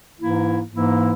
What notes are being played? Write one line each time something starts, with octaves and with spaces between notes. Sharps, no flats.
G#2 E3 A#3 E4
G#2 E3 A#3 E4